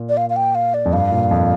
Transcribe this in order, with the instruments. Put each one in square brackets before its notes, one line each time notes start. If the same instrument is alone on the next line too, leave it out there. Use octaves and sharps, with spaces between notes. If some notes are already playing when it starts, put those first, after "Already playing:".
Already playing: [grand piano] A#2
[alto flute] D5
F5
F5
G5
F5
D5
[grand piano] F2
[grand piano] G2 [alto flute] F5
[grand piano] A#2
F2